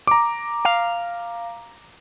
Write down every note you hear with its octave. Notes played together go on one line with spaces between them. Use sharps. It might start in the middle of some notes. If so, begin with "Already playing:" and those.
A#5 D6
F5